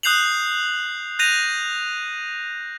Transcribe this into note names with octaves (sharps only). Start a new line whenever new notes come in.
D#6 F#6 G6 C7 F7 F#7
F#6 G6 A#6 D#7 F7